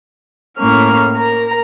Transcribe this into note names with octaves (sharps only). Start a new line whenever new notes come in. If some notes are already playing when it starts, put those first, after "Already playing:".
A2 A#3 C#4 F6
A#4 A#5